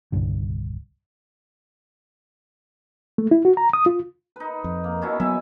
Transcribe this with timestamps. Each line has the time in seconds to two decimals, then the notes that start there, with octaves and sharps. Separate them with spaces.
0.12 D#1 C2 G2 D3
3.18 A3
3.31 E4
3.45 F#4
3.57 A#5
3.73 D#6
3.86 F4
4.36 D#4 B4
4.64 F2
4.84 A#3
5.02 B2 C#4 E4
5.20 F#3 B3 E5 G#5